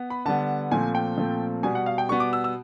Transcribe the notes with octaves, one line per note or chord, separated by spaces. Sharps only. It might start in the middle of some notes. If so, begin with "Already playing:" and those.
Already playing: B3
B5
D3 G3 B3 A5
A#2 F3 A3 C4 G#5
G5
A#2 F3 A3 C4
B2 G3 B3 G#5
F#5
F5
G5
B2 G3 B3 C#6
D6
E6
E6